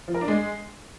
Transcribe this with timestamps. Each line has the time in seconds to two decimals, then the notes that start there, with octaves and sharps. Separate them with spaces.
0.08 F3
0.15 A#4
0.21 D4
0.28 G#3